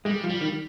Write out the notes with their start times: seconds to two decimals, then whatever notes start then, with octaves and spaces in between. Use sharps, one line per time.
0.05 G3 G#3
0.24 F3
0.30 G3
0.41 D#3